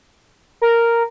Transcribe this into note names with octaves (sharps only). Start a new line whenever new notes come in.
A#4